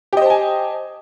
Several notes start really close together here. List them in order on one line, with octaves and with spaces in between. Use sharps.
G4 D#5 C5 A5 G#5